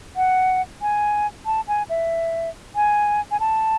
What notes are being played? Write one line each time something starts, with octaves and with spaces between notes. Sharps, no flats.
F#5
G#5
A5
G#5
E5
G#5
G#5
A5